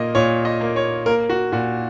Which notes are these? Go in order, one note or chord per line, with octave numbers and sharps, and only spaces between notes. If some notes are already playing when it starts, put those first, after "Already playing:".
Already playing: A#2 A#3 D#5
A#2 C#5
D#5
A#3
C#5
A#3 A#4
F#4
A#2 F#4